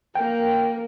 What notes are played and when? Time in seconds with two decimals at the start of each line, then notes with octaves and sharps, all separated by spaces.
0.15 A#3 A#4 G5